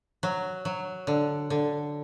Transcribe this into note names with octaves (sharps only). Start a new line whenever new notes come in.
F#3
F#3
D3
D3